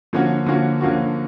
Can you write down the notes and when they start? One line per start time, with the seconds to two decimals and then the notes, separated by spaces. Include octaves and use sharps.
0.13 D3 F3 A#3 C#4 F#4
0.46 D3 F3 A#3 C#4 F#4
0.81 D3 F3 A#3 C#4 F#4